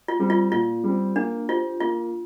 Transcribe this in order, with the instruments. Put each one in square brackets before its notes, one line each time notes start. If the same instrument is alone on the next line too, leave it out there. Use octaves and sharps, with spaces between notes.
[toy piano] F4
[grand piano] G3 C4
[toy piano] F4
[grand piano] A#2 [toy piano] F4
[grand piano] G3 C4
[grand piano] A#3 [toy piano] D4
[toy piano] F4 [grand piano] G4 C5
[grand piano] A#3 [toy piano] F4